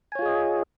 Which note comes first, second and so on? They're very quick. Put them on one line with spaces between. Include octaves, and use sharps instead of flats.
G#5 C#5 F4 G#4 D#5